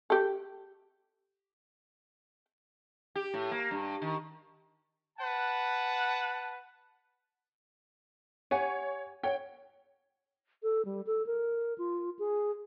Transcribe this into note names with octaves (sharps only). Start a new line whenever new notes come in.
G4 A4
G4
A2
A#3
G2
D#3
B4 F#5 A5
G4 C#5 F#5 G#5
C#5 F#5 G5
A4
G3
A4
A#4
F4
G#4